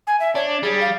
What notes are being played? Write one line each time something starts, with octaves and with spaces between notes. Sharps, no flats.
G#5
E5
D4 C#5
G3 G#4
F5